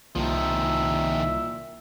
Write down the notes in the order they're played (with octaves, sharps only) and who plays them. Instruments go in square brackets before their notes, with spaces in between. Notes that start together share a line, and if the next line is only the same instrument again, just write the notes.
[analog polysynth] C2 [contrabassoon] A#2 [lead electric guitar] D#3 F3 [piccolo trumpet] E5